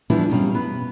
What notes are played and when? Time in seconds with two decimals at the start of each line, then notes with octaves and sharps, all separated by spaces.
0.10 E3 F3 G3 B3 D4 E4
0.30 F#2 B2 G3 C#4 F5
0.55 B3 B4